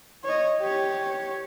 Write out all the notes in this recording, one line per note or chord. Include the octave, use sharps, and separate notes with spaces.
C#5 D#5
G4 C#5